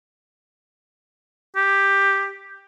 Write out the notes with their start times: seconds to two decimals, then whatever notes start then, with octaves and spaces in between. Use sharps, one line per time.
1.56 G4